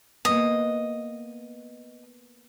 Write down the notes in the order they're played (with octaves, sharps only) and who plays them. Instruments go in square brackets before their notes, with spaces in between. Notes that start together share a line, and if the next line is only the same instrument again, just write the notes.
[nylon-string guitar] A#3 B3 [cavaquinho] D#5